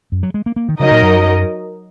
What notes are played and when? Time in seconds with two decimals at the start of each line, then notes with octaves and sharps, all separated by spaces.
0.12 F#2
0.23 F#3
0.34 G#3
0.46 A#3
0.56 A#3
0.69 D#3
0.79 C#3 F#3 D#4 A#4 D#5
0.91 A#2
1.02 F#2